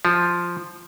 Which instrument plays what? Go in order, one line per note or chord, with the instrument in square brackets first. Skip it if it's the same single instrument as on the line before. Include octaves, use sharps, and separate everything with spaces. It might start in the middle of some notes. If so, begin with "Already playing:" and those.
[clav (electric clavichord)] F3